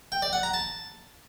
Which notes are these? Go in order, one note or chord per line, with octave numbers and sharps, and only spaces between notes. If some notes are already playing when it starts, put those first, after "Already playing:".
G5
D5
F#5
A#5
A5